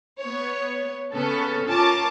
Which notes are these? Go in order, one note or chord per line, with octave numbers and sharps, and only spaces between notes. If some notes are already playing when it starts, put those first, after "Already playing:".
B3 C#5
C#3 B3 C#4 A4
C#4 F4 A#4 A5 D6